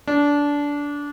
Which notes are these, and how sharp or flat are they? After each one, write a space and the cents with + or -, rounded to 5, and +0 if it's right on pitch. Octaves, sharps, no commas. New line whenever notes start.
D4 -20